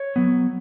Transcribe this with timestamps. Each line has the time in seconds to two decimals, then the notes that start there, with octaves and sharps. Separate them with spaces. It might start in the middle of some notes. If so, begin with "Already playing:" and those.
Already playing: C#5
0.16 F#3 B3